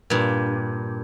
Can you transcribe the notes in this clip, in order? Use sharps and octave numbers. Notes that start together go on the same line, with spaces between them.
G2 A#2